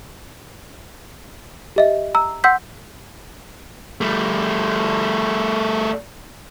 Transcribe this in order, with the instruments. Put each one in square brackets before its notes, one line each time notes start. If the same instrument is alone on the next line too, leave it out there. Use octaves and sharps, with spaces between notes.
[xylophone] G4 D#5 E5
A#5 E6
F#5 C6 E6 G6 B6
[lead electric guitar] G3 A3